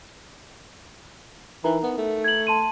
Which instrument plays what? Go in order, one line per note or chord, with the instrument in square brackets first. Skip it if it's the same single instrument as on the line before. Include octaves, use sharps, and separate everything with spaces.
[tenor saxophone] E3 [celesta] D#4 A#4 A#5
[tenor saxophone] B3
A3
[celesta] G#6 F#7
A5 C6 D#7